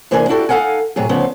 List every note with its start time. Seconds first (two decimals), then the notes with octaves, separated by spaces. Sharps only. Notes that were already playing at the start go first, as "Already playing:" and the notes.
0.11 C3 E3 A#3 D4 G#4
0.29 D4 E4 F#4 G4 A4
0.49 D#4 A4 F5 F#5 G#5
0.96 A2 C3 F#3 G#4
1.09 D2 C#3 F3 B3 C#4